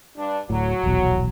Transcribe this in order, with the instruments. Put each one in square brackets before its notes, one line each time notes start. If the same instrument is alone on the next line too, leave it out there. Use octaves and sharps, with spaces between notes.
[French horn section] G2 D4
[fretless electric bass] D1 A2 [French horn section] F#3
[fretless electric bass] D#1 B1 E2